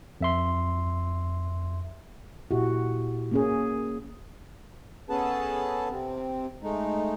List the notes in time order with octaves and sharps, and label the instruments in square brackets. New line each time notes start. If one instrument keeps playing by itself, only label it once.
[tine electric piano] F2 E5 C6
[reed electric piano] A#2 E4 G4 [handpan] F#4
[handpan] A#3 C#4 G#4
[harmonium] B3 C#4 G#4 A4 B4 A5
C3 C4
G#3 A3 D#4